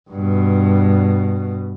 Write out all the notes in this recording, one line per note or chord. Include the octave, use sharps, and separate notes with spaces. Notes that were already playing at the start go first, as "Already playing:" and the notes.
G2 B2